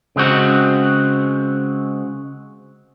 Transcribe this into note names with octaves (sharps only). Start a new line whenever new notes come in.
C#3 G#3 C4 F#4